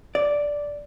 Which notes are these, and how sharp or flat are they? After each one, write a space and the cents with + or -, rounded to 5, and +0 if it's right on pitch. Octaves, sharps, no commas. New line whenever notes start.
D5 -5